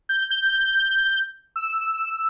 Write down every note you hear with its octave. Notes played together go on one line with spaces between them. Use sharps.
G6
G6
E6